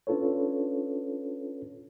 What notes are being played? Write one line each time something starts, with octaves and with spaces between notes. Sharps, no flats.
C#4 D4 F4 A4 B4 C#5